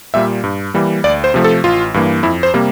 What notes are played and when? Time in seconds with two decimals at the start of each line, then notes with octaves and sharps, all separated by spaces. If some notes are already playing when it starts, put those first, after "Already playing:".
0.14 A#2 G3 A#3 E5
0.44 G2
0.74 E3 G3 A#3
1.04 D2 D5
1.24 C5
1.34 C3 F3 A3
1.44 A4
1.64 A1 F4
1.94 G2 E3 A#3
2.23 F2 E4
2.43 C5
2.54 C3 G3 A#3